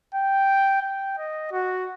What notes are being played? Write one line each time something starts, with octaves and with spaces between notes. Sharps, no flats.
G5
G5
D#5
F#4